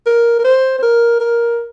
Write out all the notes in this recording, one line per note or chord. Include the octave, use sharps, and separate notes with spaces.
A#4
A#4
C5
C5
A#4
A#4